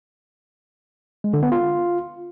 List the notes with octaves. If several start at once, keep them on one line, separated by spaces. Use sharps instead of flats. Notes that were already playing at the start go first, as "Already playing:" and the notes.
G#3
D3
B3
F4